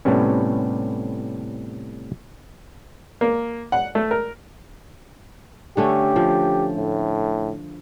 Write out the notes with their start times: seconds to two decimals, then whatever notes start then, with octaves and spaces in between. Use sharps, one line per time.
0.05 A2 C3 G3 B3 C#4
3.21 A#3
3.72 F#5
3.95 A3
4.11 A#4
5.77 D3 A3 C#4 G4
6.16 F3
6.76 A2